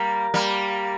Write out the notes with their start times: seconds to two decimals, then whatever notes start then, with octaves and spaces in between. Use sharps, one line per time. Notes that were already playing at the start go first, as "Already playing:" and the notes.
Already playing: G3 A#3
0.34 G3 A#3